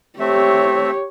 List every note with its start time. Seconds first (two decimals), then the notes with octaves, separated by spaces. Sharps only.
0.19 A3 C4 G4 C#5 E5